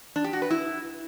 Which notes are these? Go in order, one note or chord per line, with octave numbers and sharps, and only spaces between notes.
D4
G4
F#4
B4
E4